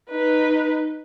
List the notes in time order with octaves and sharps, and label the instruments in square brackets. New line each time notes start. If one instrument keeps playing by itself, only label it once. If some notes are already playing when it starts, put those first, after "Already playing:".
[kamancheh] D#4 B4